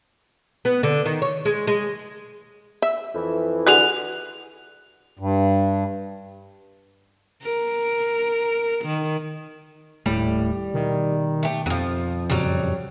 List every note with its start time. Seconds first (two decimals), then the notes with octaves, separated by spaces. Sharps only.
0.65 B3
0.83 D3
1.05 D#3
1.22 C#5
1.45 G#3
1.67 G#3
2.82 E5
3.14 F2 E3
3.67 D3 F#4 G#4 F#6 F7
5.19 G2
7.43 A#4
8.84 D#3
10.06 D#1 D#2 A2 G3 A3
10.74 B2 D#3
11.43 A3 G4
11.66 F2 F3 F#3
12.30 F#2 A#2 C#3 F#3 G3